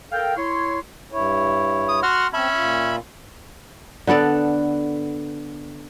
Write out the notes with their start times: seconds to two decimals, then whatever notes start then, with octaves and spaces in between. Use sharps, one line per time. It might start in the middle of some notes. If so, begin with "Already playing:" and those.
0.12 A4 A#4 F5 G5
0.36 E4 C#5 C6
1.12 G2 E4 C#5
1.89 D#6
2.03 F#4 F#5 C6 F6
2.34 C4 C#4 E5 A5 B5
2.56 A#2 F4
4.07 D3 B3 A4 D5